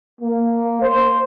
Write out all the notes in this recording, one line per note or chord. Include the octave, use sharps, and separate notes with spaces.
A#3
C5